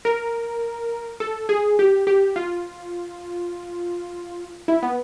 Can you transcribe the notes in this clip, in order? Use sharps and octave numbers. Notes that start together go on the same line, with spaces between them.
A#4
A4
G#4
G4
G4
F4
E4
B3